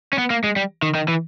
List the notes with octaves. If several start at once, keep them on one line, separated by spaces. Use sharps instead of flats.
C#4
B3
A#3
G#3
G3
D#3
D#3
E3